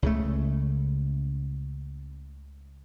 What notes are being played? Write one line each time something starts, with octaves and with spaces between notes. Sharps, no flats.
C#2 C#3 A3